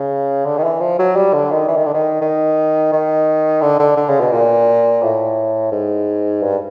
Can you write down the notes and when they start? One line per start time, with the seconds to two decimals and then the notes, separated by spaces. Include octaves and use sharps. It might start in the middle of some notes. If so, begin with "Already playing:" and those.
Already playing: C#3
0.45 D3
0.58 D#3
0.64 E3
0.80 F3
0.99 F#3
1.16 G3
1.33 D3
1.52 D#3
1.68 E3
1.77 D#3
1.86 D3
1.94 D#3
2.21 D#3
2.92 D#3
3.62 D3
3.79 D3
3.97 D3
4.09 C#3
4.20 B2
4.32 A#2
5.02 A2
5.72 G#2
6.42 G2